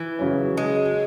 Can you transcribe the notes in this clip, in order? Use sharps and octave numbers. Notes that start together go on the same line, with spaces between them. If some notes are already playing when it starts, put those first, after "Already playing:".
Already playing: E3
C#3 F#3 C#4
G#3